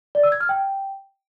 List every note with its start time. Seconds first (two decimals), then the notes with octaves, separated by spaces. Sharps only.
0.15 D5
0.23 E6
0.32 G#6
0.41 F6
0.49 G5